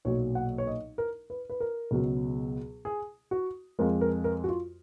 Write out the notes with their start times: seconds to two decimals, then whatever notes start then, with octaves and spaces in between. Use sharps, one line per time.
0.05 B1 A#2 F#3 C#5
0.35 F#5
0.58 C#5
0.67 D#5
0.98 A#4
1.30 B4
1.50 B4
1.60 A#4
1.91 C#2 B2 F#3
2.85 G#4
3.31 F#4
3.79 F2 F3 G#3 A#4
4.01 A#4
4.24 A#4
4.44 F#4
4.48 F4